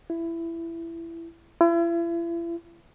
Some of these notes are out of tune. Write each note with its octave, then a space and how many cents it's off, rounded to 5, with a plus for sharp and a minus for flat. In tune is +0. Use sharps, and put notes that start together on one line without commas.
E4 +15
E4 +40